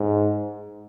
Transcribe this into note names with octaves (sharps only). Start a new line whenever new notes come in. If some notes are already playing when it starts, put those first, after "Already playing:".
Already playing: G#2